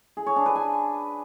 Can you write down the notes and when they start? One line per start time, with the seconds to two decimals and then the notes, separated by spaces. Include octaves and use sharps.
0.17 G#4
0.27 C#5
0.36 D4
0.46 B4
0.56 G#5